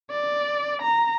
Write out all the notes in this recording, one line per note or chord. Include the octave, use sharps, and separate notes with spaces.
D5
A#5